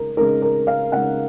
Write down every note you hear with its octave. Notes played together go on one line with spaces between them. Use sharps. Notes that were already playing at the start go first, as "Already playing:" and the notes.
Already playing: C#3 G#3 D#4 A#4
C#3 G#3 D#4 A#4
A#4
F5
C#3 G#3 D#4 F#5